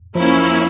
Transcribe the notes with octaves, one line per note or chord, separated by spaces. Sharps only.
F3 A#3 C#4 E4